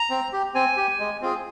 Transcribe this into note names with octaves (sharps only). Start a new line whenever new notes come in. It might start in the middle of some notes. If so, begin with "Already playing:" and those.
Already playing: A#5
C4
G4
C4 G#5
G4
G#3
C4 F4 G#4